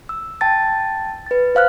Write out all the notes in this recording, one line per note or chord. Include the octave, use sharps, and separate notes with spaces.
E6
G5 A5 A6
B4 A6
C5 F5 F6 F#6